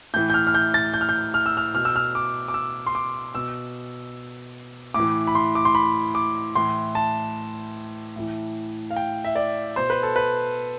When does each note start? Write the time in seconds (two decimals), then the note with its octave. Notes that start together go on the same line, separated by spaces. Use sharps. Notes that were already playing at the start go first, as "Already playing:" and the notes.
0.14 A2 E3 G6
0.30 G6
0.34 F6
0.47 F6
0.54 G6
0.74 A6
0.94 G6
1.01 F6
1.09 G6
1.34 F6
1.46 E6
1.57 F6
1.74 B2 F6
1.85 E6
1.96 F6
2.15 D6
2.48 D6
2.54 E6
2.87 C6
2.95 D6
3.35 B2 E6
4.94 A2 D6
5.00 E3
5.27 B5
5.35 C6
5.55 D6
5.65 C6
5.75 B5
6.15 D6
6.55 A2 E3 C6
6.95 A5
8.16 A2 E3
8.91 F5
8.96 G5
9.25 E5
9.36 D5
9.76 B2 C5
9.90 B4
10.03 A4
10.16 B4